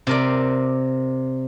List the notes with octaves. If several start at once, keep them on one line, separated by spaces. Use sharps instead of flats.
C3 A#4 D5